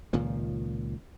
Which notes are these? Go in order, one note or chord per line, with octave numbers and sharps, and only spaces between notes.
C#2 A#2 D#3 F3